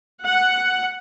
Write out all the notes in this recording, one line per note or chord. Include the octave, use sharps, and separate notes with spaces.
F#5